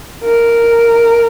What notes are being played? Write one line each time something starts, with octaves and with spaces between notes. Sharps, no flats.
A#4